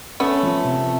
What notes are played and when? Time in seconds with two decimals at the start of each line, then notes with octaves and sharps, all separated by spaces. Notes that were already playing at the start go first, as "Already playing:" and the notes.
0.20 A3 B3 C#4
0.43 F3
0.64 C3